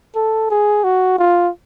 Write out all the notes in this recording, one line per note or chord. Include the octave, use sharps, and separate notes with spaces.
A4
G#4
F#4
F4